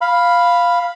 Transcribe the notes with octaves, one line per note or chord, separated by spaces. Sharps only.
F5 B5